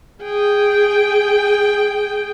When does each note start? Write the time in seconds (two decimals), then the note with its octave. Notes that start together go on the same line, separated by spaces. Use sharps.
0.22 G#4 G5